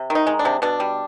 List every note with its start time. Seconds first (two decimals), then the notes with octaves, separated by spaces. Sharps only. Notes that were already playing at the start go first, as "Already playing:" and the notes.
Already playing: C3
0.10 D#3
0.15 D#4
0.27 G#3
0.39 D4
0.45 C3
0.62 B2 D4
0.80 G3